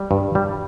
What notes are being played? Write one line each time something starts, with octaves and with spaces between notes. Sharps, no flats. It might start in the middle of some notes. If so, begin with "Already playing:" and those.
Already playing: G3
G2
G3